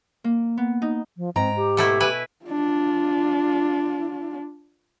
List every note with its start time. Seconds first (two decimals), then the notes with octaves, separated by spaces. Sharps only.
0.24 A#3
0.57 B3
0.82 D#4
1.17 F3
1.36 G#2 C4 G5 A#5
1.56 G4
1.77 B2 A3 E4
2.00 E4 B4 G#5
2.45 D4 F4